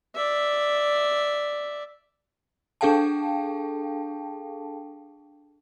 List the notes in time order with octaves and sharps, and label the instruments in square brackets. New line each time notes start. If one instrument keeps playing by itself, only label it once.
[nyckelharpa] D5 E5
[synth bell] D4 G#4 A4 F5 G5 A5